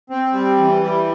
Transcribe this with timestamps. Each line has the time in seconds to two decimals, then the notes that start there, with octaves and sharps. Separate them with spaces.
0.10 C4
0.33 G3
0.58 E3
0.82 G3